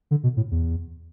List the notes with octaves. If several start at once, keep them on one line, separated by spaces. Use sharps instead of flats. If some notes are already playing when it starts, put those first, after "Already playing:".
D3
B2
A2
E2